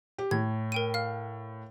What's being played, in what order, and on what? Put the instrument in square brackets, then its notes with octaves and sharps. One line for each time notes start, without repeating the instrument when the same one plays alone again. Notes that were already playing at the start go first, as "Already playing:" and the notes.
[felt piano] G4
[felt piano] A2 [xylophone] G#6
[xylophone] A#4 G5 D#7
F5 F6